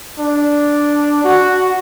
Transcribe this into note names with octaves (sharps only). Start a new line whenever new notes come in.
D4
F#4